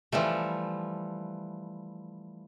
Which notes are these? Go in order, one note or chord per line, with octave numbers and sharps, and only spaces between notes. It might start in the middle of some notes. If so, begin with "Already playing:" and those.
E3 F3 G3 A3